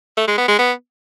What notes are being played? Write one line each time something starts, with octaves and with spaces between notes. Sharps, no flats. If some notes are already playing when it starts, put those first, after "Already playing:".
A3
G#3
B3
G#3
B3